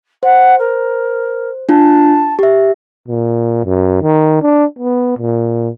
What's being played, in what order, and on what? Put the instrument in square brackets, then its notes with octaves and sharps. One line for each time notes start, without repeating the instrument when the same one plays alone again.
[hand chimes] C5 [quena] F#5
[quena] A#4
[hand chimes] D4 F4 [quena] A5
[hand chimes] G4 E5
[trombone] A#2
F#2
D#3
D4
B3
A#2